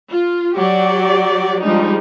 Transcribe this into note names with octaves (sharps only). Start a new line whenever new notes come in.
F4
F#3 G4 D5
F3 G3 G#3 D4 D#4